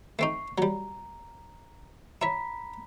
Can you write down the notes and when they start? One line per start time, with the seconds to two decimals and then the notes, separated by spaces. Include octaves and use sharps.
0.19 A3 C4 D#4 C#6 C7
0.58 F#3 G3 A#5
2.22 E4 C#5 A#5 B5 B6